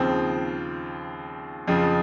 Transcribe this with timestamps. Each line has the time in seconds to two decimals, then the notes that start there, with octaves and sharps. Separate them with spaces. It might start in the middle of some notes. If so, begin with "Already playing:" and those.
Already playing: D#2 C#3 F3 C4
1.68 F2 C#3 F3